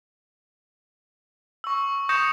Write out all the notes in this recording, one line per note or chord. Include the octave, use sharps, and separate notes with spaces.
C#6 E6
C#6 D#6 G6 A#6 C#7 E7